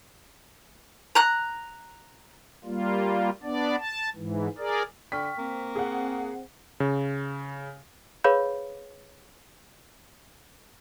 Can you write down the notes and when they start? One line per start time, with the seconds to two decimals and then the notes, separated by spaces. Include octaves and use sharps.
1.15 A#5 F#6
2.64 G3 A#3 F4
3.43 B3 D4 D5
3.78 A5
4.16 G#2 E3
4.58 G#4 A#4 D5
5.12 D3 G5 C#6 F6 B6
5.38 A#3 C4
5.76 G#4 F#5
6.80 C#3
8.24 G#4 B4 C#5 F5 B5 G6